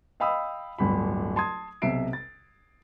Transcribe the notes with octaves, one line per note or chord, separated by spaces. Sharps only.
D#5 F5 G5 B5 D#6 E6
D1 G1 B5
A5 C6 D#6 G#6
B1 C3 E5 C7 D7
A6